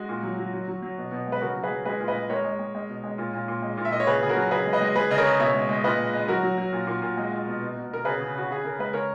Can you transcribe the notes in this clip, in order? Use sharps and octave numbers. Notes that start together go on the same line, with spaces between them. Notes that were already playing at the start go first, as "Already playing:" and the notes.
Already playing: G#3 F#4
A#2
F#3
F#3
F#3
F#3
F#3
B2
B2
G#3
B4
C#3 F#4 A#4
F#3
G#4 B4
F#3
G#3 G#4 B4
A#2
B4 D#5
G#3
G#3 A#4 C#5
G#3
G#3
G#3
B2
G#3
A#2
A#2
A#2
G#3
A#2
E5
A#2 D#5
C#5
C#3 G#4 B4
C#3 G#4
F#4 A#4
F#3
C#3 G#4 B4
G#3
B4 D#5
G#3
G#3 G#4 B4
C#3 D#5
A#4 C#5
C#3
B2 C#5 E5
G#3
G#3
A#2 B4 D#5
G#3
G#3
F#3 F#4 A#4
F#3
F#3
A#2
A#2
A#2
G#3
G#3
B2
B2
B2
B2 A#4
C#3 G#4 B4
C#3
C#3 F#4
C#3 G#4
C#3 A#4
G#3 B4
C#3 A#4 C#5